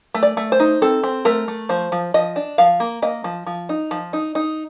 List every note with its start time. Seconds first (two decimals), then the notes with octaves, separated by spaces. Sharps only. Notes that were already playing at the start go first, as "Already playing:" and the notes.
0.14 A3
0.23 D5
0.37 A3
0.52 C5
0.60 D#4
0.82 C4 A4
1.04 C4
1.25 A3 A#4
1.48 A3
1.69 F3 C5
1.92 F3
2.14 F3 D#5
2.36 D4
2.58 F3 F5
2.80 A#3
3.02 A#3 D#5
3.24 F3
3.47 F3
3.69 D#4
3.91 F3
4.13 D#4
4.35 D#4